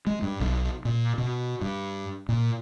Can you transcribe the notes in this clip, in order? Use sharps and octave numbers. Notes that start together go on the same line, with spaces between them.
G#3
G2
B1
A#2
B2
G2
A#2